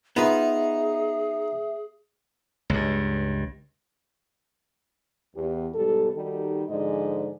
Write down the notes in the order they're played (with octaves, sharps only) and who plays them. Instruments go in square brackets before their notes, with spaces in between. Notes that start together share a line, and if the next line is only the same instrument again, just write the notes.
[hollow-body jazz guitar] B3 F4 B4 [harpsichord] D#4 [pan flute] G#4 [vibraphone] E5
[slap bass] C#2 G2
[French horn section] E2 G4
G#2 B2 G3 G4 A4
D#3 G3 D#4 F#4 G4 A4
G#2 D3 F3 G#4 D5 D#5